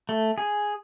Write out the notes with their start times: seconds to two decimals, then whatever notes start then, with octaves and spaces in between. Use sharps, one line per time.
0.09 A3
0.38 G#4